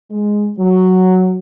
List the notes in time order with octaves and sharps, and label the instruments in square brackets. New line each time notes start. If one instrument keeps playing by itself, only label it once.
[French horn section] G#3
F#3